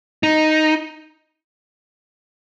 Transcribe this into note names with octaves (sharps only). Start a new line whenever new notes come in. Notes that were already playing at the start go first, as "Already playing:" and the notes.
D#4